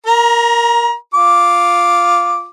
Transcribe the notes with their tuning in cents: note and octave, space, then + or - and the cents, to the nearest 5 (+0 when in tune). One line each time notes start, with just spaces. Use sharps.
A#4 +0 A#5 +30
F4 +0 D6 +0